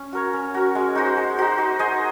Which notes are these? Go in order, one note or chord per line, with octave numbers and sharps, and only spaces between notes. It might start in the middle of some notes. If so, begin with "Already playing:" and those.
Already playing: C#4
F#4 A#4 C#5
C#4
F#4 A#4 C#5
G#3
D#4 F#4 C5
G#3
D#4 F#4 C5
D#4
G#4 C5 D#5